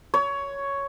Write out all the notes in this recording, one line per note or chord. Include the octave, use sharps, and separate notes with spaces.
C#5